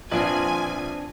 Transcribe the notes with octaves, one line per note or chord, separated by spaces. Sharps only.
A#1 C4 D4 F4 B4 G#5